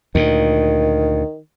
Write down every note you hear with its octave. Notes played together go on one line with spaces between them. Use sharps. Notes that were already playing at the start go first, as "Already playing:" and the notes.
D2 A#2 D#3